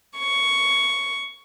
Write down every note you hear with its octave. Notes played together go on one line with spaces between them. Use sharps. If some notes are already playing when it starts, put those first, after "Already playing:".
C#6